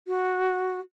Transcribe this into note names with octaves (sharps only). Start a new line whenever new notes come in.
F#4